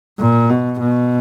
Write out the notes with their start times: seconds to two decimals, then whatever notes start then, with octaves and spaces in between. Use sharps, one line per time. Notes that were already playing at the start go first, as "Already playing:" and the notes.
0.19 A#2
0.50 B2
0.80 B2